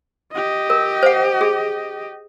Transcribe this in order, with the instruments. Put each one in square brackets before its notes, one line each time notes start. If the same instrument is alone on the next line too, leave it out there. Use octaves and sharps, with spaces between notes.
[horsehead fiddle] G4 D#5
[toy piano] A#4
C5 F#5
G#4